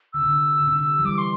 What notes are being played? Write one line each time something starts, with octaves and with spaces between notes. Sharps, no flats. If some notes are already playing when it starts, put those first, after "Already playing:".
D3 E6
C3
D3
D3
C3
D3
E3
G3 D6
C6